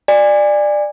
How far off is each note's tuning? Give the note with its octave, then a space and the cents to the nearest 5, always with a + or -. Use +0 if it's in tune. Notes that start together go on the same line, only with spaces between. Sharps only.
D5 +20 G#5 -25